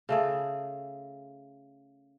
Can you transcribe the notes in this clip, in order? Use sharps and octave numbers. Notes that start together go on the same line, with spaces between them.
C#3 A3 G#4